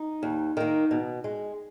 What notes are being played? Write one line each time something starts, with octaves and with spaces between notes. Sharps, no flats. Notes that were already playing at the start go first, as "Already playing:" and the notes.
Already playing: D#4
D#2
D#3 A#3
B2
G#3